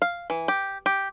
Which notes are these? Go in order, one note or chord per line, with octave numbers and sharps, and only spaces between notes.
F5
E3
G4
G4